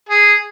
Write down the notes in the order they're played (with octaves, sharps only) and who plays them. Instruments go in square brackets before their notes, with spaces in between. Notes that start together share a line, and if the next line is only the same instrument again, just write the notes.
[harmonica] G#4